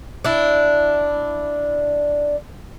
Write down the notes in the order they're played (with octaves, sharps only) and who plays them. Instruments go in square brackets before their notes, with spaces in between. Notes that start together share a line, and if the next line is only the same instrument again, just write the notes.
[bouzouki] D4 E4